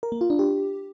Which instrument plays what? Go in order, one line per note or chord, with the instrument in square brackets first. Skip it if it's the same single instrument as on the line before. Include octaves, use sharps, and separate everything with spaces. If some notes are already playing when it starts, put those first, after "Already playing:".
[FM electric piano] A#4
A#3
F4
D4
G4